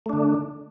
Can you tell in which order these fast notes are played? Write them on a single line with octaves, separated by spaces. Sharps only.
A3 D4 D3